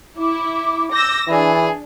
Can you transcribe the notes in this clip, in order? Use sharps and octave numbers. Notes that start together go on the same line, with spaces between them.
E4 D6
E6 G6 A#6
E3 D4 G#4 D5